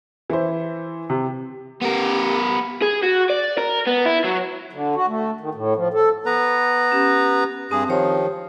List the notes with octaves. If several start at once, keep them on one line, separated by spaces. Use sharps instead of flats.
E3 E4 C5
C3
B3 G4 A#4
G#4
F#4
D5
A#4
B3
E4
F#3
D3
F#4
A3
D#3
A2
F3
A4
B3 B4 A#5
C#4 G4
G2 C4 G#4 A5
D#3 F3 G4 C5 C#5